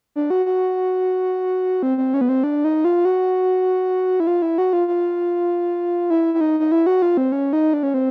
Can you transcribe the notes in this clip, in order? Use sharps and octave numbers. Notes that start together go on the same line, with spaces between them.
D4
F#4
F#4
C4
C4
C#4
B3
C4
D4
D#4
F4
F#4
E4
F4
E4
F#4
F4
F4
E4
E4
D#4
D#4
E4
F#4
F4
C4
C#4
D#4
D4
C#4
C4